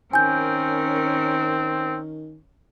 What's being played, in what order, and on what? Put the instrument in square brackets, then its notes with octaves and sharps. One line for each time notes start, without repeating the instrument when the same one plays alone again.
[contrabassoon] D#3 [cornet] C4 [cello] C#4 A#4 [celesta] G#5 G6